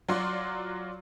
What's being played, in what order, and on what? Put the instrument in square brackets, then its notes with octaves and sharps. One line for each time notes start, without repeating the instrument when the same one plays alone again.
[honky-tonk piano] F#3 F4 F#4 D5 C6